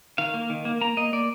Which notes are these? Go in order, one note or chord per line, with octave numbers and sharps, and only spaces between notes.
D#3 F5
A#3
D#3
A#3
A#3 A#5
A#3 D#5
A#3 D5